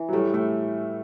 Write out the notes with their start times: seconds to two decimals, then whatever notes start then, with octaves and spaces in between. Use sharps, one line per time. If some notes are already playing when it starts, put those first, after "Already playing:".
Already playing: E3
0.09 F#3
0.13 A2 G3
0.34 A2 A3